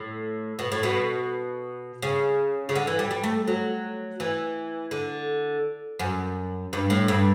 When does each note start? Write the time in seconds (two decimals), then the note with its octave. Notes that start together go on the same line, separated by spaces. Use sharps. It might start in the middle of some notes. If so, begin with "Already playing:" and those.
Already playing: A2
0.59 B2
0.72 A2
0.83 B2
2.02 C#3
2.69 C#3
2.75 D3
2.87 E3
2.99 G3
3.11 G3
3.24 A3
3.47 F#3
4.20 E3
4.91 D3
5.99 F#2
6.73 G2
6.90 A2
7.08 G2